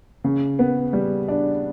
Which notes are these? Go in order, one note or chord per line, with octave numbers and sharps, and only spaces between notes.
C#3
B3
G3
D4